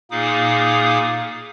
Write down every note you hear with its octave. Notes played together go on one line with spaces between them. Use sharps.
A#2 A#3 D#4 G#4 D6 D#6